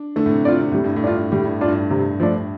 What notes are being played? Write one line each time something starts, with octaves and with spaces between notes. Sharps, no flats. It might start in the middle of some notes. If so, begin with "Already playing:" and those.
Already playing: D4
D3 A3
A2
C3
C3 F4 D5
C3
A2 G3
G2
A2
D4 F4
A2 G3
G2
D4 F4
G2
C3
F3 A3 D4